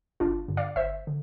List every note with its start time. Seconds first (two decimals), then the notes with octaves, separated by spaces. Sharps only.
0.20 G1 D4 F4
0.48 G2 D3
0.57 D5 F5
0.76 G1 C5 E5
1.07 D3